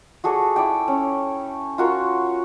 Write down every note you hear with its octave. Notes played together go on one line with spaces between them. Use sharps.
F#4 G#4 A4 D5
E4 D5 G5
C#4
F4 F#4 A#4